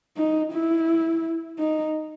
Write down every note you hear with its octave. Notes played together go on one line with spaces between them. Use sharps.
D#4
E4
D#4